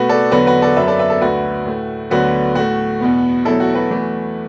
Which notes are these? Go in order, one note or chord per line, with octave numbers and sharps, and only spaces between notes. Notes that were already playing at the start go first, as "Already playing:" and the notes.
Already playing: B2 A3 F#4 B4
A4 D5
E2 D3 F#3 B3 F#4 B4
F#4 B4
A4 D5
F#2 F#3 B3 B4 E5
A4 D5
B4 E5
A4 D5
D2 D3 A3 F#4 B4
A2 A3
D2 D3 F#3 B3 F#4 B4
A2 A3 F#4
E2 B2 B3
E2 B2 F#3 A3 E4 A4
F#4
F#4 B4
E2 E3 A3